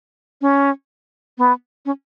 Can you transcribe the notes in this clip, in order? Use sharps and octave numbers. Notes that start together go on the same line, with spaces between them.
C#4
B3
C#4